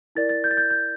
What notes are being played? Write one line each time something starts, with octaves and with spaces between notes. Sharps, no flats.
E4 A#4 D5 A6
A6
G6
A6
G6
G6